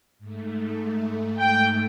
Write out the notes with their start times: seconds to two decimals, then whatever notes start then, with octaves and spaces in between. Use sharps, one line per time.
0.18 G#2 A3
1.38 G5